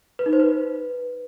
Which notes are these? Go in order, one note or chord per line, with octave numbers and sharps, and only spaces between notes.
B4
D#4
C5
B4